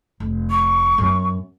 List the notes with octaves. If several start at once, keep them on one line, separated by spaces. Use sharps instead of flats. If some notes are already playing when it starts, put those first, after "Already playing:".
F1
C#6
F#2 B3